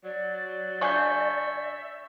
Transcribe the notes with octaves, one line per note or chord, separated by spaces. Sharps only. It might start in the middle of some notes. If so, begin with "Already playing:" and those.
F#3 D5
C#3 D4 E5 G#5 C#6 G6